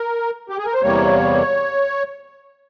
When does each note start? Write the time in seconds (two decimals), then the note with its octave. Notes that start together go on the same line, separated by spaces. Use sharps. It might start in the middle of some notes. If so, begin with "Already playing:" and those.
Already playing: A#4
0.50 G4
0.58 G#4
0.66 A#4
0.74 C5
0.82 E2 C3 G3 A#3 C#5